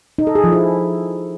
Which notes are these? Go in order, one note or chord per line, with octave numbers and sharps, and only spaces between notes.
D#4
A4
G#4
F3
E4